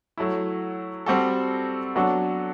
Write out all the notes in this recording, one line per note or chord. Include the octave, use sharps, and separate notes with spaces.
F#3 A3 E4
G3 C4 F#4 A4
F#3 B3 D4 F#4 A4